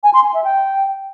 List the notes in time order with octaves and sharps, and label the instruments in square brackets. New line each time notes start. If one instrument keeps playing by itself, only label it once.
[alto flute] G#5
C6
G#5
E5
G5